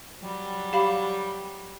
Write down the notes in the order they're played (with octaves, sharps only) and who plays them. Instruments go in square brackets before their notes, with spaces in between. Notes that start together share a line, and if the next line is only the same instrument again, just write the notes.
[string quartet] F#3 G3
[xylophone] G4 F5 B5